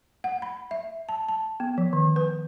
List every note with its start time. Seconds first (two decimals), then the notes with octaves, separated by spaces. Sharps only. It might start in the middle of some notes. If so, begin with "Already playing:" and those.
0.24 F#5
0.42 B5
0.71 E5
1.09 A5
1.28 A5
1.60 B3
1.78 F3
1.93 D#3
2.16 B4